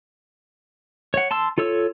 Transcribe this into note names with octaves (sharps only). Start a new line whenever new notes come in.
C#5 F#5
A5 C6 E6
F4 A4 C#5 E6